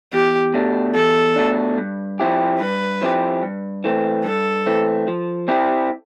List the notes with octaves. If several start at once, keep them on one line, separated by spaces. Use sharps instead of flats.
E2 G4
B2 A3 D4
E2 A4
B2 A3 D4
G2
F3 C4 E4 G4
G2 B4
F3 C4 E4 G4
G2
E3 A3 C4
G2 A4
E3 A3 C4
F3
C4 E4 G4